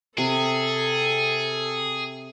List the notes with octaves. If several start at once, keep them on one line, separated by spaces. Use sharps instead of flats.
C3 G#4 A4